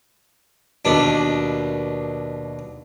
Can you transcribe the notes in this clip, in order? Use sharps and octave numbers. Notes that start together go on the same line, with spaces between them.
D#2 B2 D4